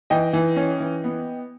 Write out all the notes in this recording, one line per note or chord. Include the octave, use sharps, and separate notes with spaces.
E3 D#5 G5
E3
C#4
E3
B3